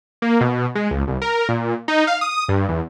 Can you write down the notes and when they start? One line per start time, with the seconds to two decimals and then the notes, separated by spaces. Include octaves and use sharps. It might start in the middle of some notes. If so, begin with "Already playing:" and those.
0.22 A#3
0.41 B2
0.75 G#3
0.91 C#2
1.08 C2
1.22 A#4
1.49 A#2
1.88 D#4
2.07 F5
2.21 D#6
2.49 G2
2.69 E2